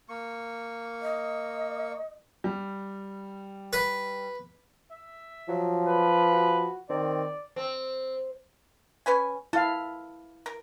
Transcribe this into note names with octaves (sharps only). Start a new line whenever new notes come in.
A#3 C#6
D#5
G3
B4
E5
F3 F#3
B4
F#4
D#3 C4 D5
C4
C#4 B4 G#5
E4 A4 F5
A#4